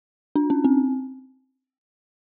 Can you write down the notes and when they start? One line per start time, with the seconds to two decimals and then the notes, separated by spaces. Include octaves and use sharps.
0.36 D4
0.50 C#4
0.65 C4